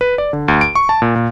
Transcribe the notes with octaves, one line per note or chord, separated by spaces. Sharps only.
B4
D5
D3
D2
D7
C#6
A5
A#2
A#2